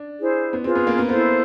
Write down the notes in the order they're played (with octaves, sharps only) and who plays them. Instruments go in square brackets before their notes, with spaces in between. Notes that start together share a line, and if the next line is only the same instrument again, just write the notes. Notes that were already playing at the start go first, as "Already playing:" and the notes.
Already playing: [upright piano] D4
[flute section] E4 G#4 C5
[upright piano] B3
[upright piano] C4 [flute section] F4 G#4 B4
[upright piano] B3
A#3
B3
[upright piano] B3 [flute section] E4 A4 C5